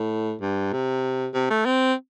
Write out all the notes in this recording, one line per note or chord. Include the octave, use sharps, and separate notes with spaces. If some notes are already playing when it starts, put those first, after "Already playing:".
Already playing: A2
G2
C3
C3
A3
C4